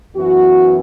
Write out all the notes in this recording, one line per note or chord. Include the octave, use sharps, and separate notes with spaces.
F#2 E3 B3 F#4